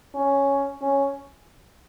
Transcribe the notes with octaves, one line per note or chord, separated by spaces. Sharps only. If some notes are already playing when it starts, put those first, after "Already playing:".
C#4
C#4